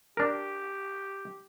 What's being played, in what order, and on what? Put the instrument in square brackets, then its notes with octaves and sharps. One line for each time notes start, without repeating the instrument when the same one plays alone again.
[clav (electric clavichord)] D4 A#4 [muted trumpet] G4